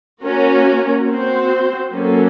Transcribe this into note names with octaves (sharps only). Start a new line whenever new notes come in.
A#3 C#4 F#4 A#4
C4 F#4 C5
F#3 A#3 C#4 A4